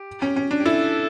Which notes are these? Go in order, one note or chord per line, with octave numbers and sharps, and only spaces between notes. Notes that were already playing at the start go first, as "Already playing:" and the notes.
Already playing: G4
C#4
C#4
D4
G4
E4 A4